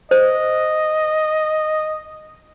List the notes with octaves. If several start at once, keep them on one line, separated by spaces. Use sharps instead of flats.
C5 D#5